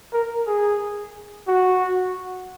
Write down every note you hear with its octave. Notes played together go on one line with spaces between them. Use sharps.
A#4
G#4
F#4